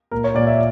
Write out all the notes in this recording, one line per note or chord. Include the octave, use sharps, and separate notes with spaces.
A#2 A#4
C#5
A#2 D5
E5